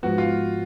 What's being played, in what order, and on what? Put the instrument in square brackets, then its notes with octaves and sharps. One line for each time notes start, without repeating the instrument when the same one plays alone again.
[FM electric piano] G#2 F3 B3 [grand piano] F#4
[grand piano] F4